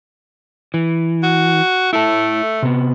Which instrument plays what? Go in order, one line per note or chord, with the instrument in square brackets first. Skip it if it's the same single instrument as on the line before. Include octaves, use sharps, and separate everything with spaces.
[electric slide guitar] E3
[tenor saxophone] F#4
[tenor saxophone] A3 [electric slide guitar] E4 A4
[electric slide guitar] C3 B3